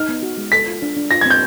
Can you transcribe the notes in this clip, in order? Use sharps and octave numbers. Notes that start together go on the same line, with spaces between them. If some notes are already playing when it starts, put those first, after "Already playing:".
Already playing: D#4 F6
B3
F#4
G#3
A4 B6
F4
D4
D4
F4 A#6
G#6
C4 G6